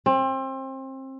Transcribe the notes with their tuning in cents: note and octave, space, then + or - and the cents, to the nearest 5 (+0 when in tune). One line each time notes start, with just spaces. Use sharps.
C4 +30